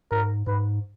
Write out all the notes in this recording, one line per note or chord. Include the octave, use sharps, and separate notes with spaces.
G#2 A#4
G#2 B4